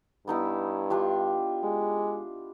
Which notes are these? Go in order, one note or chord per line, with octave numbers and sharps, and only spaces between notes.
G2 B3 D#4 E4
D4 F4 G4
G#3